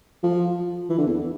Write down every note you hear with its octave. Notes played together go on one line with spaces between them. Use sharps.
F3
E3
D3
E2